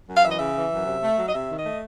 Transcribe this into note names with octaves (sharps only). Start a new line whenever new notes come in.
F#2
F5
E3 E5
D#5
C#3 E5
E3
F#2
C3
A3
F#3
D#5
C3 E5
D#3
D#5
A3